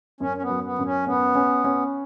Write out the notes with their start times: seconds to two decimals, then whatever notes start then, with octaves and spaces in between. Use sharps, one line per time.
0.20 F#2 C#4
0.37 C#4
0.42 B3
0.50 F#3
0.64 B3
0.79 F#2
0.85 C#4
1.06 B3 C#4
1.35 C#4
1.64 C#4